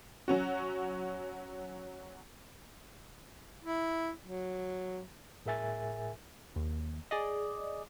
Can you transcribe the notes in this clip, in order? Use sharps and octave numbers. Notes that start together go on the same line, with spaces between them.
F#3 C#4 F#4
E4
F#3
A2 G#4 A#4 E5 G#5 A6
D#2
G#4 D5 D#5